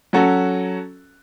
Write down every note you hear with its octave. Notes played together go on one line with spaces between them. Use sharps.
F#3 C#4 F#4 A4